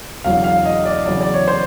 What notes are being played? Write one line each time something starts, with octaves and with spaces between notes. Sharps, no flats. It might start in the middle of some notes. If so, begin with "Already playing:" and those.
E1 E2 C#3 F#3 F5
F5
D#5
D5
E2 C#3 F#3 D5
D5
C#5
C5